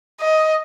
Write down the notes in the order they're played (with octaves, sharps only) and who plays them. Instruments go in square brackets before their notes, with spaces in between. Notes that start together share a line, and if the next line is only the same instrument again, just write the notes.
[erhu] D#5